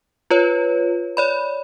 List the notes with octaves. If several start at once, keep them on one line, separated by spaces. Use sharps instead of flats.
F4 B4 C#5
C#5 D5 B5